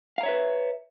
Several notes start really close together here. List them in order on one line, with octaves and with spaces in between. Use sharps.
F5 A#5 C#5 E5 B4